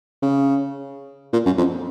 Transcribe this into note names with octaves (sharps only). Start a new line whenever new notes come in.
C#3
A#2
F#2
F2